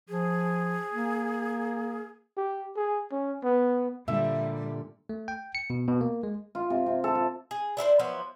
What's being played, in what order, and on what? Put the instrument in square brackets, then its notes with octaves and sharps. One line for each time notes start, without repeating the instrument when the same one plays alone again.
[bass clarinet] F3 [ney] G#4
[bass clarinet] A#3
[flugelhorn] G4
G#4
C#4
B3
[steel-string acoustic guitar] A#2 D3 [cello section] G3 [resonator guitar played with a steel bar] E5
[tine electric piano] A3
G5
C#7
B2
B2
A#3
G#3
[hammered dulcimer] F4
C3
C3
A4
F4
[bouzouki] G#4
D4 E4 A#4 C5
F3 F#3 B3 E5